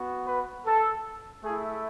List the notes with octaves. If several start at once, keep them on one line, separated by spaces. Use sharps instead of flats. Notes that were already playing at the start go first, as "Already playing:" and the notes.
Already playing: B3 F#4
B4
A4
A3 E4 G#4